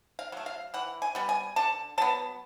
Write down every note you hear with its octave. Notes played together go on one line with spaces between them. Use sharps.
F5
F#3 A3
F5
E3 F#5
G#5
G3 B3
G#5
D3 A5
F#3 B3 A5